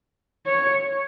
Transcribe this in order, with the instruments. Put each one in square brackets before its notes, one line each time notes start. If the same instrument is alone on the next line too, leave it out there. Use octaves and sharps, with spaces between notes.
[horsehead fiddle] C#5